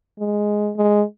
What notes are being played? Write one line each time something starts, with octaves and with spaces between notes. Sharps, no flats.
G#3
G#3